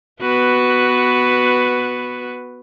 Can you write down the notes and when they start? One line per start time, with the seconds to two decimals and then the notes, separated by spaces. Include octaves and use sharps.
0.22 B3 F#4 B4